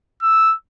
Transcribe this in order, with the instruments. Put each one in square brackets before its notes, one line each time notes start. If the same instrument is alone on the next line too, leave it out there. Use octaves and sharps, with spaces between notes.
[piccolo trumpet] E6